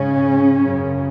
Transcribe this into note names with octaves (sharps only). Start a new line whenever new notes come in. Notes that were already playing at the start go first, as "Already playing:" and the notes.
Already playing: G#2 C#3 C#4
F#2 C#3